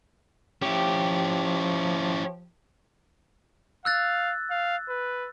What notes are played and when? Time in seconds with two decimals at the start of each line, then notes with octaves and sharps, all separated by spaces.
0.62 F3 C#4 E4 G4
3.85 F5 E6 F#6 A6
4.51 F5
4.89 B4